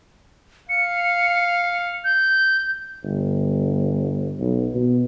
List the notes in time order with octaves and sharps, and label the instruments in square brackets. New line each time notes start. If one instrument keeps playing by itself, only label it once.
[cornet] F5 [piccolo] C#7
[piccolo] G6
[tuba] G1
B1
B2